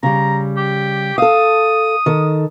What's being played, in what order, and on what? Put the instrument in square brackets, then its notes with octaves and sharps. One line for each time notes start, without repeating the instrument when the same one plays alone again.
[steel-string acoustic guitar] C#3 G3 [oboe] A#5
[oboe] G4
[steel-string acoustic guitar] A4 F5 [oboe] D#6
[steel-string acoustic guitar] D#3 A4